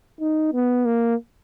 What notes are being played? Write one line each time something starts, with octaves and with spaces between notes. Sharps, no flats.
D#4
B3
A#3